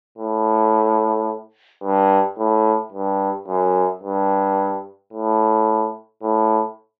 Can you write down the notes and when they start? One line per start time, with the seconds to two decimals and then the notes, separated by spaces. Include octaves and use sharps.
0.18 A2
1.83 G2
2.38 A2
2.92 G2
3.48 F#2
4.03 G2
5.13 A2
6.23 A2